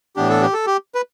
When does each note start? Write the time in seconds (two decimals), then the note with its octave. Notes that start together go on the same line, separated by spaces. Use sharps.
0.16 A2 E3 B3 D4 G4
0.29 A4
0.42 G4
0.53 A4
0.67 G4
0.95 B4